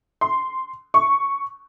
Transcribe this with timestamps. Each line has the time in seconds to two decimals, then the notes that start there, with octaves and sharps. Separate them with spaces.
0.21 C6
0.94 C#6